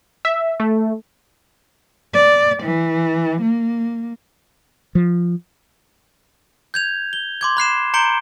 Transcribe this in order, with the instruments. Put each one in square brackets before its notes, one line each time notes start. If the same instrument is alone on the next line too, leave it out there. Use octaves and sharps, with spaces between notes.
[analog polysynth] E5
A3
[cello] D5
E3
A#3
[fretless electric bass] F3
[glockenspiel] G6 G#6 F7
G7
C6 D6 G#6
B5 F#6 C7 E7
A#5 C6 G6 C#7 D7 G7